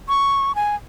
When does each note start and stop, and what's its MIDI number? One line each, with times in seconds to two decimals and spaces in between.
0.09 0.55 85
0.55 0.75 80